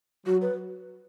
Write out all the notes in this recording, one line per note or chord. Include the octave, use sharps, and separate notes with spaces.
F#3 F#4
B4